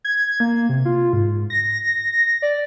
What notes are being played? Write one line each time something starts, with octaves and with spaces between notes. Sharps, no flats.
G#6
A#3
C3
F4
G#2
A#6
D5